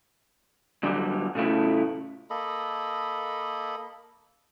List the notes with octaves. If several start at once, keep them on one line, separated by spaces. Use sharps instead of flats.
G2 D3 F#3 G3
A2 C#3 A3 E4
A#3 A4 D#5 B5